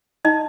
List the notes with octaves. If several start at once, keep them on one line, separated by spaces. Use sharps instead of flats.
D#4 D#5